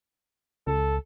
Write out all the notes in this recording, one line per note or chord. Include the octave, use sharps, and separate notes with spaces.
C#2 A4